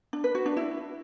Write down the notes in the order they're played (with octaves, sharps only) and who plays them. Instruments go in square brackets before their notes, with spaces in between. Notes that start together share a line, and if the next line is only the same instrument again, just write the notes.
[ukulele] D4
B4
F#4
D4
E4